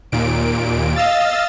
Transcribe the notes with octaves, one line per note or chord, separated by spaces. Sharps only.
D#2 A#2 D7
D#5 F5 E6 A6